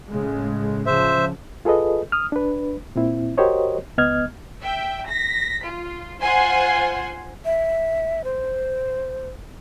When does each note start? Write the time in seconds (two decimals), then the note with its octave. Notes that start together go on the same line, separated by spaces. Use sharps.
0.10 A2 C#3 G#3
0.86 C#3 F3 C5 E5
1.65 F4 G#4 A4 B4 D#5
2.12 D#6 F6
2.32 D4 B4
2.96 A#2 C4 E4
3.38 F#4 G4 A#4 C5 C#5 D#5
3.98 C#2 B3 D#5 F6 G#6
4.61 E5 G5
5.08 A#6 B6
5.65 F4
6.20 F4 C5 F#5 G#5 C6
7.45 E5
8.24 C5